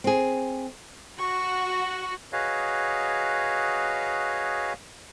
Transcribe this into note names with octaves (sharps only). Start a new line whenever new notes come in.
C4 G#4
F#4 C#6
F#4 G#4 B4 C#5 D#5 F5